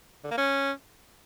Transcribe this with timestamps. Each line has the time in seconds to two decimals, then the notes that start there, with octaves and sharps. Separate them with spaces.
0.24 D3
0.31 A#3
0.38 C#4